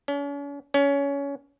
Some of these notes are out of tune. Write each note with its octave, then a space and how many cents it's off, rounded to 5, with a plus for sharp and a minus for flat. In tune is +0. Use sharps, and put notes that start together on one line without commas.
C#4 +40
C#4 +20